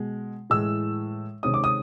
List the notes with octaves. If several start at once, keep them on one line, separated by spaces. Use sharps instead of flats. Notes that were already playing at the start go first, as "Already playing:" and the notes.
Already playing: B2 G#3
A2 E3 G#3 E6
C3 D#3 G#3 C#4 D#6
D6
D#6